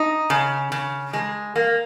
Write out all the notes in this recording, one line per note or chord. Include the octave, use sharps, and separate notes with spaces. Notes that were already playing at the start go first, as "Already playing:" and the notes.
Already playing: D#4
C#3
C#3
G#3
A#3